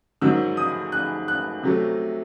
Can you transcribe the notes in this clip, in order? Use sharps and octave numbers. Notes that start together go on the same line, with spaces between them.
G#2 D#3 F#3 E6
D#6
F#6
F#6
C3 F#3 A3